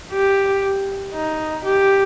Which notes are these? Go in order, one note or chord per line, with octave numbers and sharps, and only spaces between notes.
G4
D#4
G4